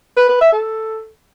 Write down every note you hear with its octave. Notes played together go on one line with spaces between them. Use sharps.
B4
B4
E5
A4